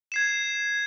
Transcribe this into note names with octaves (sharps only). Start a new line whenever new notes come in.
G#6 C7 E7